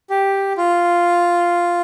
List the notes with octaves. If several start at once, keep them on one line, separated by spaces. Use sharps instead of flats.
G4
F4